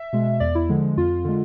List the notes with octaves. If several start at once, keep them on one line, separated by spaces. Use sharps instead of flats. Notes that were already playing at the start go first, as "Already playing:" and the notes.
Already playing: E5
B2 G#3
E2 D5
E4
D3 F3 G#3
F2 F4
D3 G#3